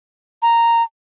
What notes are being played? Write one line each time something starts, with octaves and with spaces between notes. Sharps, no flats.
A#5